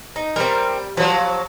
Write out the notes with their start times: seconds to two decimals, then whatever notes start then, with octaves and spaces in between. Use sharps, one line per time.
0.16 D#4
0.36 G3 C4 A#4
0.97 F3 F#3 B4